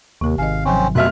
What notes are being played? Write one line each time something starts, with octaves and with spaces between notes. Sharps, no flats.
D#2 C3 G4
G#1 D#5 F5 G#5
C3 F3 F#3 C4 C#4
F1 B2 F4 E5 F6 F#6